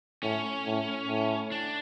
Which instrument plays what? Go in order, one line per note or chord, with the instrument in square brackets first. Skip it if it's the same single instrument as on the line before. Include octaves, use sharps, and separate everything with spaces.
[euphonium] A2 [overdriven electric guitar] C#4
[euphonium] A2
A2
[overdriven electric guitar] D4